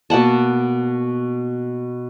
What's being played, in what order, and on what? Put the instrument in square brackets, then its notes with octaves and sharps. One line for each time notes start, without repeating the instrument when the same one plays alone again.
[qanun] B2 A#3 F#5 A5